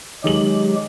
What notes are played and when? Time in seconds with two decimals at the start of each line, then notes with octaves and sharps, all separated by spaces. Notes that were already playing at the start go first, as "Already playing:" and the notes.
0.24 D#3 F#3 G#3 G4 G#4 F#7